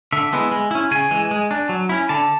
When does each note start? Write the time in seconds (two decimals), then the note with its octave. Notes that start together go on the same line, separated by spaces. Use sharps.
0.12 D3 E5
0.33 G#3 B3 E4
0.52 G#3
0.71 C#4 E4
0.91 C#3 G#5
1.11 E3 G#3
1.31 G#3
1.51 D4
1.69 F#3
1.89 C#4 E4
2.09 D3 A5